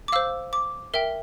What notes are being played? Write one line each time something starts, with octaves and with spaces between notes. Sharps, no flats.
D6
C5 F5 E6
D6
A#4 E5 G5